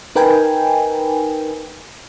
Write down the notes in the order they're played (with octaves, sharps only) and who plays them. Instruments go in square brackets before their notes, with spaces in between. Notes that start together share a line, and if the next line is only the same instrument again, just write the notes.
[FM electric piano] D#4 A#4 B4 G5 G#5